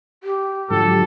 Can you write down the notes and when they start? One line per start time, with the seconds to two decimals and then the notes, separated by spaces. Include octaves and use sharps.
0.23 G4
0.70 G#2 D3 F3 F#3 A4